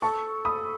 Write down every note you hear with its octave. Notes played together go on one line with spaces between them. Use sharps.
A4 A5 C#6
B5 D#6